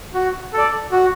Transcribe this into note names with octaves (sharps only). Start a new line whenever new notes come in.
F#4
A4 D5
F#4